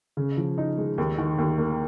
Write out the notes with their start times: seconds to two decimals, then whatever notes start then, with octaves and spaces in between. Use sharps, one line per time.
0.17 C#3
0.37 F3
0.58 D#4
0.78 G#3
0.98 D#2
1.18 D#3
1.38 D#2
1.58 A#3